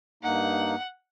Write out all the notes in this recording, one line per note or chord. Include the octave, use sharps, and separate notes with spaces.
G2 A#3 D#4 F#5